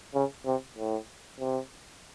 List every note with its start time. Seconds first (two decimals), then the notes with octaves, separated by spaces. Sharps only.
0.14 C#3
0.46 C3
0.78 A2
1.39 C3